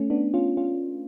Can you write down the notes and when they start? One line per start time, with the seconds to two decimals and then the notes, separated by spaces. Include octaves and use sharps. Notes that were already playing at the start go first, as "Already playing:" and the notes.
Already playing: A3 C#4
0.10 B3 D4
0.34 C#4 F4
0.57 C#4 F4